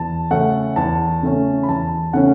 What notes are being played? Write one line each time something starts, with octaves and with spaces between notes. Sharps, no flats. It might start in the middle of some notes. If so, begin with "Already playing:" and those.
Already playing: E2 A5
C#3 A3 C#4 F#5
E2 A5
C#3 A3 C#4
B5
E2 A5
C#3 A3 C#4 F#5